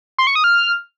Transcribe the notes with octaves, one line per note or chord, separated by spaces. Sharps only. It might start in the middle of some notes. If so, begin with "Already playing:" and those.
C6
C#6
D#6
F6